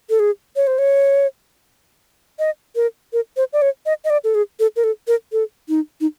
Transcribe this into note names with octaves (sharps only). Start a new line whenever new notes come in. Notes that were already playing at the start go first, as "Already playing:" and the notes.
A4
G#4
C#5
C5
C#5
D#5
A#4
A#4
C5
D5
C#5
D#5
D#5
D5
A4
G#4
A4
A#4
A4
A#4
A4
D#4
D#4